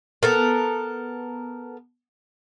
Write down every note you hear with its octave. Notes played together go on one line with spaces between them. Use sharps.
B3 A4 A#4